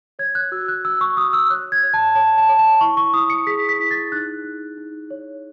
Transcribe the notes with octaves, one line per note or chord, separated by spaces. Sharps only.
C#5 G#6
F#6
F#4 E6
F#6
F#4 E6
C#6
F#4 D#6
E6
C#5 F#6
G#6
C#5
A5
C#5 A5
A5
C#5
A5
E4 C#6
C#6
E4 D#6
C#7
G#4 B6
B6
E4
A6
D#4 F#6
D#4
D#4
C#5